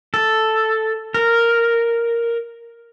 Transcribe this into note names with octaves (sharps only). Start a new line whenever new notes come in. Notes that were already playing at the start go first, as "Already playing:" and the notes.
A4
A#4